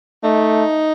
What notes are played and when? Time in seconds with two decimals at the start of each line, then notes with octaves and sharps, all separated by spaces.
0.24 A3 D#4